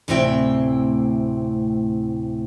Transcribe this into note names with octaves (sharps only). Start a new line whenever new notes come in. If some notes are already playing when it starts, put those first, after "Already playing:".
D2 A2 C3 C4 E4 G5